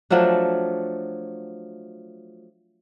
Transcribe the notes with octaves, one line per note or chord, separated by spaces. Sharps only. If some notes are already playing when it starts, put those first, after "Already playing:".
F3 F#3 A3 D4